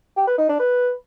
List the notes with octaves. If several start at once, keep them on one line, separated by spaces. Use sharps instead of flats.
G4
B4
D#4
D4
B4